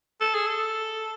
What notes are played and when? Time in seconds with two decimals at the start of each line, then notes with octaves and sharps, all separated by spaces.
0.21 A4
0.35 G#4
0.47 A4